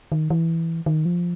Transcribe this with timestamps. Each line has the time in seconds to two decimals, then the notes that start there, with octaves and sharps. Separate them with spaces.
0.12 D#3
0.30 E3
0.86 D#3
1.05 F3